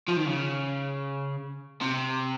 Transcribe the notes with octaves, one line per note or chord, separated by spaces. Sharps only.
F3
D#3
C#3
C3